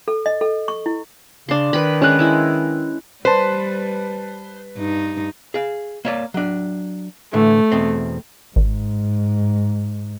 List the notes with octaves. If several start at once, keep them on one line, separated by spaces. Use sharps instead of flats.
A4
D#5
A4
C#6
E4
C#3 D4 C6
D#3 B4 B5
G#3 C#4 B4 F#6
G#3 E4
G3 B4 C5 A5
G2 D#4
G#4 F5
A#3 C#5 D5
F#3 D4
A2 D3 E3 A3
E2 B2 C4
G#1 G#2